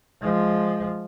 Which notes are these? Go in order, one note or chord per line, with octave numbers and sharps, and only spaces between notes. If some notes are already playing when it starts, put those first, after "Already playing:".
F3 G#3